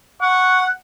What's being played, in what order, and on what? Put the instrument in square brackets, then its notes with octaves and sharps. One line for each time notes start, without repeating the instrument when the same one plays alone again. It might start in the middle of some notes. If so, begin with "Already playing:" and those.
[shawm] F#5 [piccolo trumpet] C#6